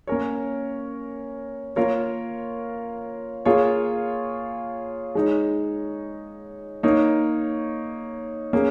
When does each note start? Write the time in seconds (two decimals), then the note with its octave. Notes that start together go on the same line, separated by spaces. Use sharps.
0.07 A#3 C#4 A#4 C#5
1.76 A#3 F4 A#4 C#5
3.45 A#3 F4 G#4 C#5
5.15 G#3 D#4 C#5
6.83 A#3 D#4 C#5
8.53 A#3 C#4 G#4